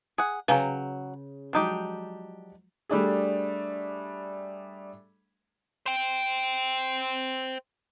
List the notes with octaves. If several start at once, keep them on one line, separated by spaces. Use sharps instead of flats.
G#4 F#5
C#3 F#3 B4 F5 G5 G#5 A#5
F3 F#3 G#3 D4 D#4 G4
G3 A3 D4 G#4
C5 G5